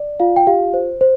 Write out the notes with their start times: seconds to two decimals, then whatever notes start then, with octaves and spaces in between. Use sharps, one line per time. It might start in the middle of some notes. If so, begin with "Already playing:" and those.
Already playing: D5
0.20 F4 F5
0.36 G5
0.47 G4 F5
0.74 C5
1.01 C5